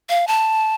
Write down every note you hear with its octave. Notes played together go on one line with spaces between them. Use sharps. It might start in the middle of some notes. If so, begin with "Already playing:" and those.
F5
A5